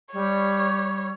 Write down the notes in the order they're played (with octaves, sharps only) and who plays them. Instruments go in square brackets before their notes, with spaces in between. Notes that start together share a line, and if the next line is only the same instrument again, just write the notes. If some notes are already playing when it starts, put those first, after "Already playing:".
[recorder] G3 [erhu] C#5